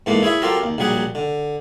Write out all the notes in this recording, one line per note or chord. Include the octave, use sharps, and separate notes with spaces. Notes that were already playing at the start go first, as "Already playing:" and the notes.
G#2 E3 A3 A#3
E4 G#4 C#5 E5
F#3 C4 F4 G4 A4 A#4
D#2
A#1 F#3 G3 G#4 F#5
D3